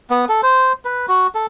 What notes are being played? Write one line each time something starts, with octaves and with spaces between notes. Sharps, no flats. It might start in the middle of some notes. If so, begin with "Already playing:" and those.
B3
A4
C5
B4
F#4
A4